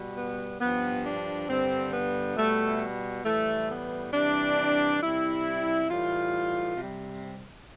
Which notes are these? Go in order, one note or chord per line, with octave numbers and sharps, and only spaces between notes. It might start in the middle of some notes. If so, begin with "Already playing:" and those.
Already playing: B2 G3
B3
G2 F3 B3
D4
G2 D3 G3 C4
B3
B2 G3 A3
A2 E3 G3 A3
B3
C3 E3 G3 D4
C3 G3 E4
A2 E3 G3 F4
C3 G3